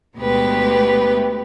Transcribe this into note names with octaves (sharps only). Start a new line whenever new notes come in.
D2 B2 G#3 B3 G4 B4